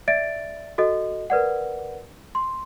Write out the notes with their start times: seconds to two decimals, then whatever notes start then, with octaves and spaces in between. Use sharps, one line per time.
0.08 D5 E5 A6 D7
0.78 F#4 A4 D#5
1.30 A#4 B4 D5 F#5
2.35 C6